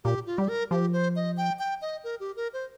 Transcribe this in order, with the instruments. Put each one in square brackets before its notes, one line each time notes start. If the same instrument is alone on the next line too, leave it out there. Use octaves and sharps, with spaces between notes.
[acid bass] A#2 [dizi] G4
[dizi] F4
[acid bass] G3 [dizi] G4
[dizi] A#4
[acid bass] F3 [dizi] G4
[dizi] C5
D#5
G5
G5
D#5
A#4
G4
A#4
C5